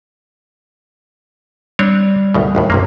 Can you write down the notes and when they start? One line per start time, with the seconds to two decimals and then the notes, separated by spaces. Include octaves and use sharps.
1.79 G3 C4 D4 C#5
2.34 G#1 D2 B2
2.55 G#1 D#2 A2
2.70 B1 F#2 C3 A#3